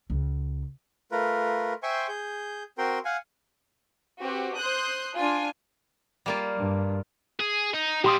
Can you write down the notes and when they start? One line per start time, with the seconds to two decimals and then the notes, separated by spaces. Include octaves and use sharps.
0.10 C#2
1.12 A3 F4 A#4 B4
1.83 C5 E5 G5 G#5 C6 C#6
2.08 G#4 G6
2.78 C4 F#4 A#4 G5 C6
3.05 F5 F#5 G#5
4.19 C4 F#4 G4 B4
4.56 C5 C6 D#6 F#6 G6
5.15 D4 F4 G#5
6.26 G3 A#3 F4
6.58 G2
7.40 G#4
7.74 D#4
8.04 A#2 G3 G4 C6 D#6